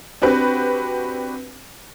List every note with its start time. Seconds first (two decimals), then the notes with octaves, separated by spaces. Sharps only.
0.22 C4 D4 F#4 G4 B4